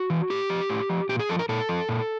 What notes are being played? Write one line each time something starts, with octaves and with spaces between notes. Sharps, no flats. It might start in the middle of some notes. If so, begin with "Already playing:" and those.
Already playing: F#4
E3
A2 G4
F3
A2
F3
A#2 G4
G#4
F3 A4
A#4
A#2 A4
F3
A#2